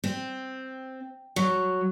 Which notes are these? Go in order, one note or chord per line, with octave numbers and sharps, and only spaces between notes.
C4
F#3